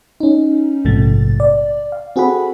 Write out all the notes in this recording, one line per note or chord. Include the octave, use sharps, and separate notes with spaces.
C#4 D#4
A#1 G#2 C3 F3 A3 A6
D5
F5
C4 F#4 G#4 A4 F#5 B5